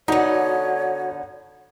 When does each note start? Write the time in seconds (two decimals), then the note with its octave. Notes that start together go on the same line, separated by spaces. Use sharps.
0.08 D3 B3 D#4 F#4 C#5 D5